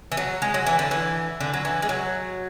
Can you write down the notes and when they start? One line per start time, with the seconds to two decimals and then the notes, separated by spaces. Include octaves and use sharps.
0.12 E3
0.17 F#3
0.42 G#3
0.54 F#3
0.67 E3
0.79 D3
0.91 E3
1.41 D3
1.54 F#3
1.65 E3
1.82 G#3
1.89 F#3